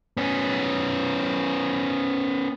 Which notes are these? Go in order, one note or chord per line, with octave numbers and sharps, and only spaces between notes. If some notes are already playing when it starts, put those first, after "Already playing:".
B3 C#4